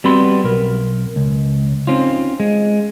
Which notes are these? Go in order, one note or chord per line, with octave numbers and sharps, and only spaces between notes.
G3 B3 C4 F#4 B5 C6
B1 A#4
C#2
C4 C#4 D#4 F4
G#3